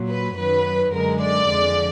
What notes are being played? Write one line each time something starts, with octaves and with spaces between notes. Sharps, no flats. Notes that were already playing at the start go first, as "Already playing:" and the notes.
Already playing: A#2 F#3
B4
F#2 D#3 F#3 B4
F#2 D3 G#3 A#4
D5
F2 D3 F3 G#3